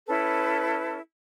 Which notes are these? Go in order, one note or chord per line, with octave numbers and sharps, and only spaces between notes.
C#4 E4 A4 B4